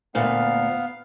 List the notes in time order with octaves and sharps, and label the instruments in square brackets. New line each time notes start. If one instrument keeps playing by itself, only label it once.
[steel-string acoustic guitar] D2 A#2 [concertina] B3 F5